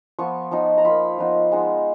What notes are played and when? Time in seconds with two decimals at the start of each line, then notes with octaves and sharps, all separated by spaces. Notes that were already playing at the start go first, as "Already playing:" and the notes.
0.19 F3 B3 F4 C#6
0.51 F3 B3 D#4
0.78 A#5
0.85 A#3 F4 B5
1.18 F3 B3 D#4
1.52 G#3 B3 D#4